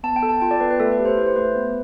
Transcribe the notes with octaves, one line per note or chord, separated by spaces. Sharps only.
B3 A5
G5
A4
A5
F4 G5
D5
B3 B4
B4
A3 A4
B4
G4
C5
E4 B4
C5
A3 B4
B3